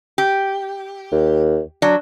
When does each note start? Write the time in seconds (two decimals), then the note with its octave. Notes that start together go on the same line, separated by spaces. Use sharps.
0.18 G4
1.12 D#2
1.82 F#3 D4